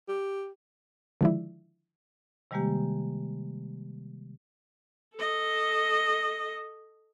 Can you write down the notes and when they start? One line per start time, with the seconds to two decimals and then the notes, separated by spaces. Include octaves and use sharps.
0.08 G4
1.21 D3 D#3 F3 G#3 D4 E4
2.51 C3 D#3 G3 G#3 A#3 G4
5.15 A4 D#5